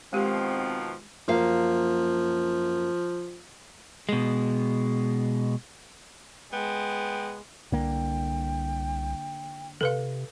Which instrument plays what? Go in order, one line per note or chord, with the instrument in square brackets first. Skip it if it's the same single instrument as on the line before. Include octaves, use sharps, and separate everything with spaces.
[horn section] B2 D#3 F3 [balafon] G#3 G4 [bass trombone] C4
[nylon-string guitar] F#2 A#3 F5 [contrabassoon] F3
[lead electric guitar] B2 G#3
[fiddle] G#3 [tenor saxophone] B3 [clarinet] G5
[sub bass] C2 [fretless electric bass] D3 A#3 [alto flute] G5
[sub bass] C3 [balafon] A4 B4 F5